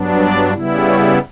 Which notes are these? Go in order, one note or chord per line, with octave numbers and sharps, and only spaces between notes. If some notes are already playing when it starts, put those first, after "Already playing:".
Already playing: G2 F#3 B3 D4
D5
C#3 G3 B3 E4
C#5